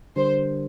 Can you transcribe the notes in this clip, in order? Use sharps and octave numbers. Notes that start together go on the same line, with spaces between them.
D3 G3 D4 G4 A#4 C5